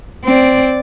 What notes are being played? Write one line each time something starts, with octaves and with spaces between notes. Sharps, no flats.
C4 D5